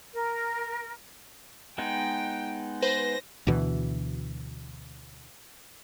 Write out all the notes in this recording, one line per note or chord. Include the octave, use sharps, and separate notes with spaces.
A#4
G#3 B3 D#4 G5
B4 C5 A#6
D2 B2 E3